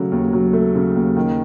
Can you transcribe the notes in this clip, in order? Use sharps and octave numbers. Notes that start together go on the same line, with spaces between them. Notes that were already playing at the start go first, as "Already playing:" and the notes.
Already playing: C#3 F#3 A3
D#2
F#3
A3
C#3
D#2
D#3